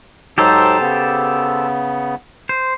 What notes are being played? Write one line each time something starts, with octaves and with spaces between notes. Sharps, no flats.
G#2 F#3 D#4 G4 A4 C5
C#3 B3
C5